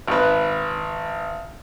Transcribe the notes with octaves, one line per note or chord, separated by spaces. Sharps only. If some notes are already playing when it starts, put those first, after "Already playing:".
G#1 B4